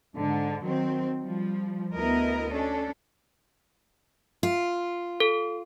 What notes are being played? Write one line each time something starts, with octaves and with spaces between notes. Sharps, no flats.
G#2 D3
D#3 F#3 C4
F3 G3
D2 B3 E4 A#4 D#5
C#4 D4 A4
F4
A4